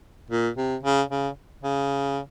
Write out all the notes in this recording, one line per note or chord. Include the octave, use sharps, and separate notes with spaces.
A#2
C3
C#3
C#3
C#3